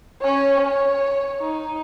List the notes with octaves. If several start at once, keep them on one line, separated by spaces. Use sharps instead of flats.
C#4 C#5
C#5
D#4